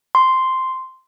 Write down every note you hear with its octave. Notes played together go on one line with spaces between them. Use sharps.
C6